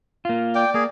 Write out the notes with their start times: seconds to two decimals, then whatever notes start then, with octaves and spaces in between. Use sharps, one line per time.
0.25 A#3 F4
0.55 D5 G5
0.74 A#3 G#4